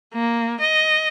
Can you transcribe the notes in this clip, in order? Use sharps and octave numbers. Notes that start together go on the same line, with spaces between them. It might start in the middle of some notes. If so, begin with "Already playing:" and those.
A#3
D#5